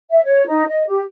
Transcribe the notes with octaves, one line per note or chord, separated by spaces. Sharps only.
E5
C#5
D#4
D#5
G4